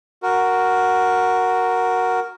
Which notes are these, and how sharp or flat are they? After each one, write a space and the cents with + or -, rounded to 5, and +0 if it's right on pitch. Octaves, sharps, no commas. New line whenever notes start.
F#4 +0 A#4 +0